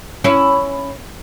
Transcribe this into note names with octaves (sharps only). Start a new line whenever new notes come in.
C#4 E4